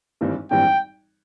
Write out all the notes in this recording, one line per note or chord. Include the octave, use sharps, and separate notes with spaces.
G#1 G2 E3 G3 C4
G#1 G2 E3 G3 C4 G5